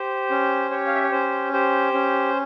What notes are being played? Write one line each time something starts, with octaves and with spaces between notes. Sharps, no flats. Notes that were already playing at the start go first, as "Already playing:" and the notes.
Already playing: G4 C5
C#4
G4 C#5
F5
E5
C#5
C#4 C5
G4 C5
C#4